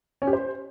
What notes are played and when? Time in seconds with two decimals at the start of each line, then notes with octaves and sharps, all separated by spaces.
0.22 C#4
0.27 G4
0.33 C5